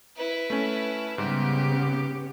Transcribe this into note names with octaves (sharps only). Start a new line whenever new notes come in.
E4 B4
A3 C#4
G#2 C#3 G3 B3 G4